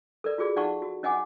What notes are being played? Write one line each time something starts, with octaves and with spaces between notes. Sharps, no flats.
A4 A#4 D5
F4 F#4 G#4 D5
D#4 D5 F5 F#5 A5 C#6
F#4
C#4 D#5 F#5 G#5 D6